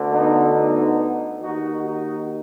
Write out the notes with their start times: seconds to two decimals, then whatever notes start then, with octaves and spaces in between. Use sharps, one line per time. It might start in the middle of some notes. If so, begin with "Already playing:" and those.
Already playing: D2 D3
0.11 B3 D#4
0.55 B3 D#4
1.41 D#2 D#3 D#4 F#4
1.85 D#4 F#4